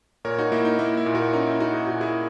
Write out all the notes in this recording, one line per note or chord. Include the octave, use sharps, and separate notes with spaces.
A#2 A#4 C#5
D#4 F#4
A#3 E4
D#4
A#3 E4
E4
A#2
F#4 A#4
C#4 D#4
E4
C#4 D#4 F#4
G#4
A#2 F#4
E4 G#4